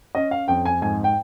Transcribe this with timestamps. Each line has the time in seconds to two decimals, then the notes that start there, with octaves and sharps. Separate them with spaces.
0.15 C#4 D#5
0.31 F5
0.48 F2 G5
0.66 G#5
0.82 G#2 G#5
1.04 G5